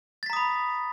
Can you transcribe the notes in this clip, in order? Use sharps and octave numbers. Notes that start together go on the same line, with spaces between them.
A#5 B5 D#6 A6 B6